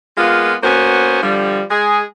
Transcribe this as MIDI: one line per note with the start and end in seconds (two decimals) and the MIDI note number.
0.17 0.55 56
0.17 0.55 58
0.17 0.55 59
0.17 0.55 65
0.63 1.20 58
0.63 1.20 59
0.63 1.20 61
0.63 1.20 66
0.63 1.20 72
1.22 1.62 50
1.22 1.62 53
1.22 1.62 55
1.71 2.02 56
1.71 2.02 68